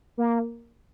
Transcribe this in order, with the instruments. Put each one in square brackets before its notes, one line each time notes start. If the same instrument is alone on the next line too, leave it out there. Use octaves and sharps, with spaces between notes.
[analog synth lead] A#3